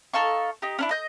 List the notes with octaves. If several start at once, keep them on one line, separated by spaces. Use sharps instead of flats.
D#4 A4 F5 C#6
D#4 G4
C#4 D4 E4
D#5 G6